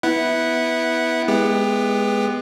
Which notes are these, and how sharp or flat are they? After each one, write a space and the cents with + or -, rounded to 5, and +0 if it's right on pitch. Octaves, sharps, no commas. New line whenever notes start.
B3 +0 E4 -15 F#5 +0
G#3 +0 B3 +0 G4 +25